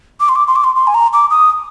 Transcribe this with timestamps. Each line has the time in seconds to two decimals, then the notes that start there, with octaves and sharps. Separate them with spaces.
0.20 D6
0.29 C6
0.36 D6
0.48 C6
0.56 D6
0.64 C6
0.76 C6
0.87 G#5
0.95 A#5
1.13 D6
1.30 D#6